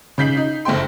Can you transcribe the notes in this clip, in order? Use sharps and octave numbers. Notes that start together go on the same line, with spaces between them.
C#3 D#4 G6 B6 C7 F#7
D#4
F#1 A3 C5 G5 C6